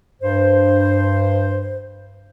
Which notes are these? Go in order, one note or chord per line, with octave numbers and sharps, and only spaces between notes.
G2 C5